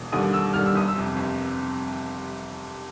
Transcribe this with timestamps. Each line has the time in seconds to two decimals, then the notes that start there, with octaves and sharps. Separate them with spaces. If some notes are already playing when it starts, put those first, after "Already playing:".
Already playing: E1
0.12 D#2 D3 G3 D#6
0.33 E1 E6
0.54 D#2 D3 G3 F6
0.66 E6
0.75 G1 D#6
0.88 E6
0.96 F2 C3
1.16 G1